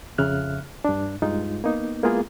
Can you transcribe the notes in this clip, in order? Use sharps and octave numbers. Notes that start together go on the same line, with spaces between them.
F2 C#3 E5 F6 F#6
G2 D4
G2 G#3 D#4 F4
A#3 B3 D#4
G#3 A#3 B3 E4 F4 G#4